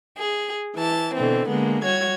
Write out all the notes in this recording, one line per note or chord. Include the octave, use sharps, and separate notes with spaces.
G#4
E3 A5
B2 D3 E3 C4
D3 G#3 A#3 B3
G3 F#4 C#5 G#6